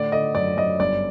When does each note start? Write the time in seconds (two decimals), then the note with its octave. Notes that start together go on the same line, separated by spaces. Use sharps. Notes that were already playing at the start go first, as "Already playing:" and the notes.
Already playing: A2 D3 D5
0.12 D3 D#5
0.35 F#2 D5
0.57 F#2 D#5
0.80 G1 D5